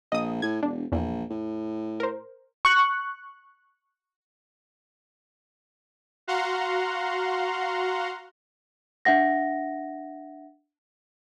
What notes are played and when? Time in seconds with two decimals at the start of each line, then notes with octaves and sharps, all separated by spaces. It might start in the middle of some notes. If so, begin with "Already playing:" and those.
0.12 A#1 D#5 D#6
0.42 A2 G#6
0.63 E1 D4
0.92 A#1 E2
1.30 A2
2.00 A#4 C5
2.65 C#6 F#6
6.27 F#4 F5 F#5 A#5 C6
9.05 D4 E5 F#5 A#6